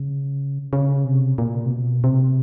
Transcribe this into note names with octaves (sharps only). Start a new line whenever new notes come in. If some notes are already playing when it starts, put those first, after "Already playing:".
Already playing: C#3
C#3
C3
A#2
C3
B2
C3